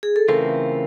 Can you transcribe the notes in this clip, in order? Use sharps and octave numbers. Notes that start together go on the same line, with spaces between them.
G#4
A4
C#3 E3 A3 C4 F4 A#4